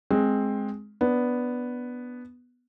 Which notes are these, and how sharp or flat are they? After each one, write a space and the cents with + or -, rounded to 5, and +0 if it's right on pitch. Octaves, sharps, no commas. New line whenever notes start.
G#3 +10 C4 +10
B3 +0 D4 -5